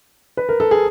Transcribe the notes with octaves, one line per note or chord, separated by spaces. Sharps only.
B4
A#4
A4
G#4